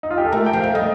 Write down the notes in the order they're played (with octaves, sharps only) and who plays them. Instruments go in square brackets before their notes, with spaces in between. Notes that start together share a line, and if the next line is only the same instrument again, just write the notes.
[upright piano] D#4
F4
G4
A4
[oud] A3 [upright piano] A#4
[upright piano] G5
[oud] F3
[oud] A3 [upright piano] F5
[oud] G3 [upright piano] D#5